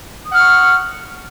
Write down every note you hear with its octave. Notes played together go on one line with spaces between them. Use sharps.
F#5 C#6 D#6 F6